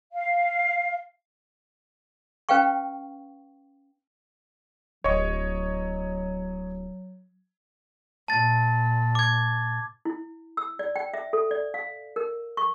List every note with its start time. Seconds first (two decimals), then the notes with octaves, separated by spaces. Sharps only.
0.13 F5
2.49 C#4 B4 F5 G5 C#6
5.04 D1 F#3 C#5 D#5 C#6
8.28 A#2 A5 A6
9.15 D6 G#6
10.05 E4
10.57 E6
10.79 D5
10.96 G5
11.14 E5
11.33 A4
11.51 D5
11.74 F5
12.16 A#4
12.57 C#6